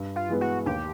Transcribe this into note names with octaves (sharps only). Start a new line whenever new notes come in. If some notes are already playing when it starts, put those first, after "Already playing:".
Already playing: G2
F4
E3 G#3 B3
F#4
D#2 G4